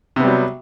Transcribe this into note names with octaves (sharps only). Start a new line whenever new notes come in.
C3 F#3 G3 B3